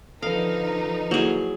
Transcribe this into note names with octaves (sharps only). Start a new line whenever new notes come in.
D3 F3 D#4 A4 B4 F5
F#3 A#3 E4 G#4